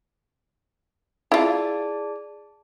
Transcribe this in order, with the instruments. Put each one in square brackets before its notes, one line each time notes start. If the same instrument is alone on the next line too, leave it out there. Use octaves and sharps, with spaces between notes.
[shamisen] E4 F4 [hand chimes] G#4 D5 A5